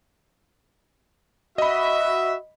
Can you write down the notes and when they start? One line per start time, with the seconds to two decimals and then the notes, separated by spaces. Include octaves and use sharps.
1.58 F#4 D#5 E5 B5